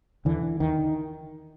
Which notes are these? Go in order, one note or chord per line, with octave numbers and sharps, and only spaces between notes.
D#2 D3 E3
D3
D#2 D#3
D3